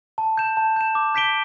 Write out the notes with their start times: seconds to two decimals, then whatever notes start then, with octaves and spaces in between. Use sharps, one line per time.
0.18 A5
0.37 G6 E7
0.57 A5
0.76 G6 E7
0.95 D6
1.15 G6 B6 D7 G7